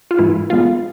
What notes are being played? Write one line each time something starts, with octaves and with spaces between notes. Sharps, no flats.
F4
G#2 E3 G#3 E4
B2 G#3 B3 F4